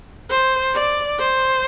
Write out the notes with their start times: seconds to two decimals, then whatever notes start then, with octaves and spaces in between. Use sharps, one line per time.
0.30 C5
0.74 D5
1.19 C5